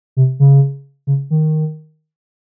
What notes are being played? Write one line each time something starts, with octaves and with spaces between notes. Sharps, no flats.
C3
C#3
C#3
D#3